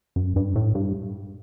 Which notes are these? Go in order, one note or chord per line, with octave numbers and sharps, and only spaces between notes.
F#2
G2
A2
G2